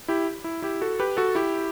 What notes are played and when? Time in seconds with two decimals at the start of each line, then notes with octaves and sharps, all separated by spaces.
0.08 E4 G4
0.44 E4
0.62 E4 G4
0.81 F#4 A4
1.00 G4 B4
1.17 F#4 A4
1.35 E4 G4